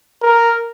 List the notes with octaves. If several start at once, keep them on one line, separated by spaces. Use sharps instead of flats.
A#4